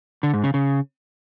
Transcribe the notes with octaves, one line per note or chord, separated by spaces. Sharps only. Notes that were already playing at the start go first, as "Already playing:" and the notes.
D3
G#2
C#3
C#3